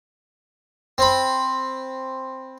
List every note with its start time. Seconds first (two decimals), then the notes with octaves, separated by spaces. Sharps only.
0.98 C4 B5